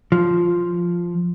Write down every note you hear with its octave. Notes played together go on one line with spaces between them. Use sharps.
F3